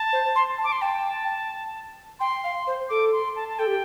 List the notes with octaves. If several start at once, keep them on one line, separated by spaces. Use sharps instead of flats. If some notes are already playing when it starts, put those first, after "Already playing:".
Already playing: A5
C5
C6
A5
D6
C6
G5 A5
G5 C6
F5
C5
A4 D6
C6
A5
A5
A4 G5
G4